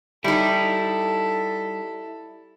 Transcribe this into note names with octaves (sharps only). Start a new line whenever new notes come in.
G3 D#4 E4 A4